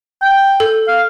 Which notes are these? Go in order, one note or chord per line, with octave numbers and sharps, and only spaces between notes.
G5
A4
F5